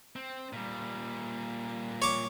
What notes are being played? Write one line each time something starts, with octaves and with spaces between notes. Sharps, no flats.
C4
A#2 G3
C#5 D6